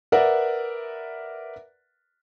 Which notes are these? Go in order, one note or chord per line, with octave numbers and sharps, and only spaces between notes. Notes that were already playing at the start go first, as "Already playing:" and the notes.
A#4 B4 D5 E5 F#5